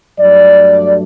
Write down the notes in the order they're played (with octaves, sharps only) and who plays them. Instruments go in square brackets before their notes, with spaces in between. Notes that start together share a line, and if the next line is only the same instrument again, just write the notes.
[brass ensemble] G2 F#3 A3 D5